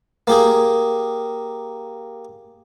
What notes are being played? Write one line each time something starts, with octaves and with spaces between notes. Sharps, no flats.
A#3 G4 G#4